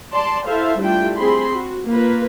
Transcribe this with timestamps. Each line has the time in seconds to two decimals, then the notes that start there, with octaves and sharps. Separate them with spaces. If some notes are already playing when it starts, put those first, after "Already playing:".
0.13 D5 A5 C6
0.48 E4 A4 C5 E5 F5
0.79 G3 A3 D4 E4 F4 G5
1.18 C4 G#4 B5 C6
1.56 F#4
1.87 A#3 F4 B4